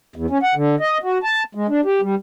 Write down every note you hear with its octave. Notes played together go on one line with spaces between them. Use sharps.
E2
C#4
F#5
D3
D#5
F#4
A5
G#3
D4
G4
G3